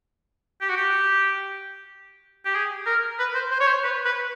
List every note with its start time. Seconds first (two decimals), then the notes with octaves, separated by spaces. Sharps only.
0.61 G4
0.69 F#4
0.76 G4
2.45 G4
2.54 G#4
2.86 A#4
3.19 B4
3.35 C5
3.51 C5
3.60 C#5
3.67 C5
3.84 B4
4.05 B4